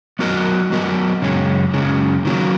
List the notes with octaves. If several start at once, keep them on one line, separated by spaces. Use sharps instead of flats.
F#3 B3 F#4 A#4 D#5
F#3 B3 F#4 A#4 D#5
F#2 C#3 G#3 C#4
F#2 C#3 G#3 C#4
D#3 F#3 A#3